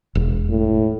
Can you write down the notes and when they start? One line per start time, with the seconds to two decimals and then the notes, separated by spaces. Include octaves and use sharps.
0.15 E1
0.49 A2